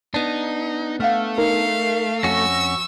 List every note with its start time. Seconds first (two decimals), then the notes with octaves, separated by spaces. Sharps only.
0.14 B3 D4 D#4
1.00 A3 F5 F#5 F6
1.38 D#4 A#4 F5
2.23 F2 C#4 F#4 C#6 E6 A#6